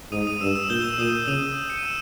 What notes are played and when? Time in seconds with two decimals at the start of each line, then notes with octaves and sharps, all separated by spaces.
0.12 G#2 D#6 D#7
0.27 D#6 D#7
0.41 G2 E6 E7
0.56 E6 E7
0.70 A#2 G6 G7
0.84 E6 E7
0.98 A#2 D#6 D#7
1.27 C#3 D#6 D#7
1.70 C#7
1.78 D#7
1.85 E6 E7